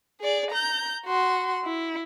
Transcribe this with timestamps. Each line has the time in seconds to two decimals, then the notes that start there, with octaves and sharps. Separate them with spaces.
0.21 G#4 D5
0.51 A#5 G6
1.06 F#4 C6
1.64 E4